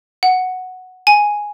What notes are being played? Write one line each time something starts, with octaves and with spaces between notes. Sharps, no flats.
F#5
G#5